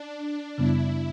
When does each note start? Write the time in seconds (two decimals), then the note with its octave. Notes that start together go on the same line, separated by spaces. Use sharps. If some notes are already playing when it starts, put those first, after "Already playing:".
Already playing: D4
0.58 F#2 C#3 G3 B3 E4